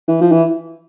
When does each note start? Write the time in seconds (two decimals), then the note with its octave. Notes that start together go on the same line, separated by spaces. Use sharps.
0.08 E3
0.21 F3
0.32 E3